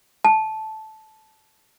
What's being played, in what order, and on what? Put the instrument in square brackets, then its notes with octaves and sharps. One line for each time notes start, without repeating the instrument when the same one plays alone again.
[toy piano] A5